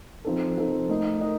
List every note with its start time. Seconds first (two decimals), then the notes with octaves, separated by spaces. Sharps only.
0.25 F3 C4 D#4 A4
0.57 F3 C4 D#4 A4
0.89 A3 D#4 A#4 D#5
1.21 D#4 A#4 D#5